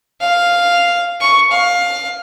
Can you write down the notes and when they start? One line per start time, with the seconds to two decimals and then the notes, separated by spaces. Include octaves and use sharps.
0.20 F5
1.20 C#6
1.51 F5